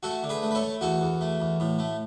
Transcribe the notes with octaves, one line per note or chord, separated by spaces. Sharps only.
A3 F#4 A4
D3
G#4 B4
A3
B4
A4 C#5
A3
E2 F#4 A4
E2
A3
E2
A2
A3